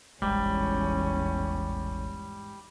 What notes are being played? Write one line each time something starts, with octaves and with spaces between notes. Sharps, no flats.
E1 A1 E2 G#2 G3 C#4